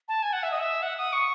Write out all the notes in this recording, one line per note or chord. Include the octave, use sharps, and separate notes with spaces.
A5
G#5
F#5
E5
D#5
E5
F#5
D#6
C#6